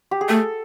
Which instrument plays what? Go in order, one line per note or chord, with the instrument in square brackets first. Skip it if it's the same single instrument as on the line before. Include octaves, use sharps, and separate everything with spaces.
[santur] G4
G#4
[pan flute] A3 [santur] A4